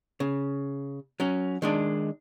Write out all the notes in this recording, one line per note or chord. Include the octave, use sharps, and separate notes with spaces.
C#3
F#3 C#4
D#3 G#3 D4